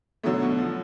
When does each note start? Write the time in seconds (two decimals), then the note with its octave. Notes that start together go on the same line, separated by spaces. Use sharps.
0.23 B2 D3 F#3 A3
0.42 B2
0.58 F3